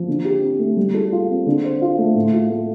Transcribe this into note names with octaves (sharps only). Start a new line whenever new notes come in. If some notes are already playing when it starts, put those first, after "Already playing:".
Already playing: F3
D3
G4
C4
A3
G3
A4
F4
C4
D3
C5
F4
A3
A2
F4
A3